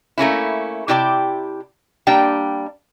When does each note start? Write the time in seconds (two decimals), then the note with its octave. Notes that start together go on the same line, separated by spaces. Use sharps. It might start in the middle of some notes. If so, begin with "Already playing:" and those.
0.18 A3 A#3 C#4 E4
0.88 C3 E4 G4 D5 G5 A5
2.07 G3 A#3 D4 G5